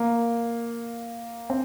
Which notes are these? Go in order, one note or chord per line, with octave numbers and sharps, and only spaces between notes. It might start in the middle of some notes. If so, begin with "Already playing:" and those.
Already playing: A#3
C4